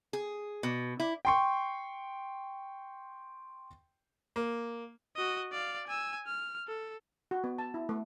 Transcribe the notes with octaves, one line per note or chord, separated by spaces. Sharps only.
G#4
B2
E4
G5 C6 C#6
A#3
F#4 D#5
D5 F5
G#5 E6
F6
A4
F#4
B3
A5
E4
A3